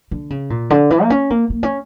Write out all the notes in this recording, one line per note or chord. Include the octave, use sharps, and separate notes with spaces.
D3
C#3
A#2
D3
E3
A#3
C#4
A#3
A#3
C#4